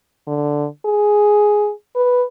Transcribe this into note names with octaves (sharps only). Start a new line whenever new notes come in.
D3
G#4
B4